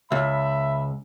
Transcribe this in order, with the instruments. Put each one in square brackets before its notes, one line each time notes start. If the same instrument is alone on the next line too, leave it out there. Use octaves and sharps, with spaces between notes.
[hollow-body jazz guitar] C#2 [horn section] E5 B5